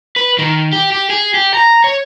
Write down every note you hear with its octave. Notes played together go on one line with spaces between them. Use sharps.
B4
D#3
G4
G4
G#4
G4
A#5
C#5